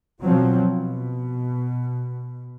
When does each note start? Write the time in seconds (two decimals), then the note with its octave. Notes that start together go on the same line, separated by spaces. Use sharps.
0.23 B2 F3 F#3 C4
0.60 B2